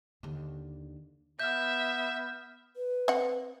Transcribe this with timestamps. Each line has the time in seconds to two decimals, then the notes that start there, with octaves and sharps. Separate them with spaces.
0.23 D#2 D3
1.40 B3 E5 F6 G6
2.76 B4
3.08 C4 F#5